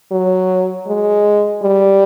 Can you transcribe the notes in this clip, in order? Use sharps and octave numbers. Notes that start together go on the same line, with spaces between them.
F#3
G#3
G3